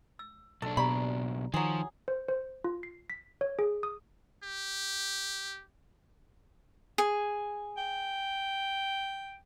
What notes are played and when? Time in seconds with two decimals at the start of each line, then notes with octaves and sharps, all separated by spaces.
0.19 E6
0.62 B1 D4 A4
0.77 B2 G4 D5 A#5 B5
1.54 D#3 F3 F#3 G#4
2.08 C5
2.28 C5
2.64 F4
2.83 C7
3.10 B6
3.41 C#5
3.59 G#4
3.83 D#6
4.43 G4
6.98 G#4
7.77 G5